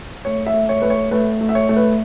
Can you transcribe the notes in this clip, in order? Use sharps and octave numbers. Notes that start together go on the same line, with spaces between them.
A3 C#5
E5
A3
C#5
A3 B4
C#5
A3 B4
A3
E5
C#5
A3
B4